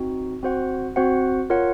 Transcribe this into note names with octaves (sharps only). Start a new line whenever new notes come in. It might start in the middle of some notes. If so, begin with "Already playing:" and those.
Already playing: C4 D#4 F#4
C4 F#4 C5 F#5
C4 F#4 C5 F#5
F4 A#4 C#5 F#5